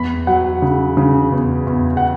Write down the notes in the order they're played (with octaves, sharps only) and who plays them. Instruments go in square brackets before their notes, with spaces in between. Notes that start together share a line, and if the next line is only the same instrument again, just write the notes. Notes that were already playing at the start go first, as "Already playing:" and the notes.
Already playing: [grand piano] E2 B5
F#3 F#5
C#3
C#3
E2
E2
F#5